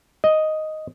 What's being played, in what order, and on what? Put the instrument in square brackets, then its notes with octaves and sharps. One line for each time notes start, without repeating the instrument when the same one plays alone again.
[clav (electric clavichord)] D#5